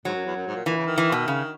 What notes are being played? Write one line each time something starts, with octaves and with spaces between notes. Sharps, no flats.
G#2 F#3
F#2
E2
F#2
G#2
A#2
A#2 E3
C#3
D#3
E3
B2
C#3